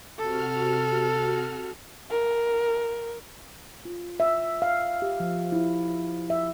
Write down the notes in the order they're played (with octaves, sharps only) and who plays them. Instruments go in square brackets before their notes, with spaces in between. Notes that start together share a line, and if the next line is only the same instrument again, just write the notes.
[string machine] C3 F#4 F6 [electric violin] A4
[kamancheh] A#4
[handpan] F4
E5
F5
G4
F3
E4
E5